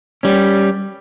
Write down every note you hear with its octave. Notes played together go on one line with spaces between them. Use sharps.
G3 C#4